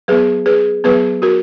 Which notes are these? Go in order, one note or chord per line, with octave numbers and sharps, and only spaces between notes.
F#3 B3 G#4 B4
G#4 B4
F#3 B3 G#4 B4
F#4 A#4